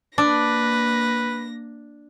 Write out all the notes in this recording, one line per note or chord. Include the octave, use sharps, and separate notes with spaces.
A#3 D4 B4 A#6